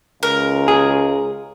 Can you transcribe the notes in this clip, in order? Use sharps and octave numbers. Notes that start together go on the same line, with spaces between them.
C#2 A#4
G#4